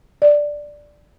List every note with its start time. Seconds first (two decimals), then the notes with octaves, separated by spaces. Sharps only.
0.22 D5